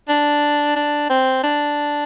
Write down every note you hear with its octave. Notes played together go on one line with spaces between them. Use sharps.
D4
D4
C4
D4